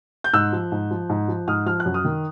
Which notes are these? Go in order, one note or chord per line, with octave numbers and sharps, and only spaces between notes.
G6
G#2 E6 F#6
F3
G#2
F3
G#2
F3
G#2 D#6 F6
F3 F6
F#6
F#2
D#6 F6
D#3